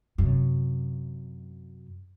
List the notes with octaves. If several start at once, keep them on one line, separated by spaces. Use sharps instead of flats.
F#2 C3